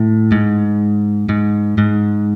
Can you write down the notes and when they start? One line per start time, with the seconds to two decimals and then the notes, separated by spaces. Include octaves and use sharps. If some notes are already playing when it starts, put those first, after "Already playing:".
Already playing: A2
0.32 G#2
1.29 G#2
1.78 G#2